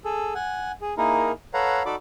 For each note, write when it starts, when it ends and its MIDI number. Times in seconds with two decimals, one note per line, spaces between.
0.05 0.34 68
0.05 0.34 69
0.35 0.72 78
0.35 0.72 80
0.81 0.94 68
0.98 1.32 58
0.98 1.32 63
0.98 1.32 64
0.98 1.32 68
0.98 1.32 70
1.54 1.83 69
1.54 1.83 71
1.54 1.83 73
1.54 1.83 77
1.54 1.83 78
1.54 1.83 82
1.86 1.95 63
1.86 1.95 66
1.86 1.95 69
1.86 1.95 74
1.86 1.95 83
1.86 1.95 86